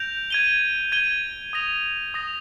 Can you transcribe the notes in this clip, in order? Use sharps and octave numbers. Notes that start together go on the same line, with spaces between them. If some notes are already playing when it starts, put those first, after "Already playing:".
Already playing: G6 A#6 D7 F7
G#6 D#7 G7
G#6 D#7 G7
D#6 A#6 F7
D#6 A#6 F7